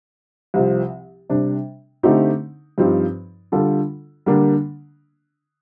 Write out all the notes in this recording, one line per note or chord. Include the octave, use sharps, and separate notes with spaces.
C2 C3 F3
C3 G3 D4
D3 A3 C4 D#4 G4
G2 F3 C4 D#4 G4
D3 G3 D4 F4 A4
D3 G3 A#3 D4